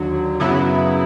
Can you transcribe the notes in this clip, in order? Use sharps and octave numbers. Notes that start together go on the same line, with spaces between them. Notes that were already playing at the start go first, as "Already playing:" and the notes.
Already playing: D#2 D3 F#3
F#2 C#3 F#3 B3 E4